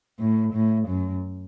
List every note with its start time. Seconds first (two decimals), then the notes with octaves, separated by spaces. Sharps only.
0.20 A2
0.53 A2
0.88 F#2